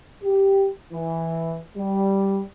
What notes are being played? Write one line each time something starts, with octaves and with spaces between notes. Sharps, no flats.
G4
E3
G3